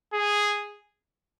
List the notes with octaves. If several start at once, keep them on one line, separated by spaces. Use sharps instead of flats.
G#4